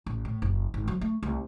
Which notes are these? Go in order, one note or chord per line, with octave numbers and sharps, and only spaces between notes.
A1
A2
F#1
G#1
F#3
A3
C2